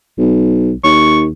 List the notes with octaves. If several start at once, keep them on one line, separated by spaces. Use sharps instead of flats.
B1
D#2 C#6